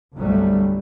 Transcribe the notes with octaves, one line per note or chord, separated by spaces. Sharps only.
G1 C2 F#3 G3 A3